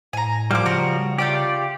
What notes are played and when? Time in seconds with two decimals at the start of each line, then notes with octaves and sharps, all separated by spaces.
0.13 A2 G#5 A#5
0.51 F3 G3 A#3 D6
0.66 C#3 F#4 A#4
1.18 A3 F4 G4 D5